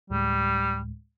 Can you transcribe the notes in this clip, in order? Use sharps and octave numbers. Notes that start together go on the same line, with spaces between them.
D2 A2 G3 G#3